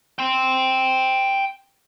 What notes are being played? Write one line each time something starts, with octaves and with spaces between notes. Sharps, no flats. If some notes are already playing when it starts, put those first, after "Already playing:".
G5 C6